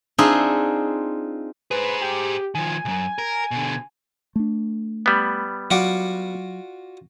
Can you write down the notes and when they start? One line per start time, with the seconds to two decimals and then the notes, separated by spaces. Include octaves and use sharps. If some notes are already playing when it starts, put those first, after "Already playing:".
0.18 C4 D4 D#4 F4 G#4 E5
1.71 G#4 B4 C5
2.01 G4
2.55 D#3 F3 G#5
2.85 B1 F#2
3.18 A#4
3.51 B2 D3
4.36 A3 D4
5.06 G3 B3
5.71 F#3 F4 F#4 D5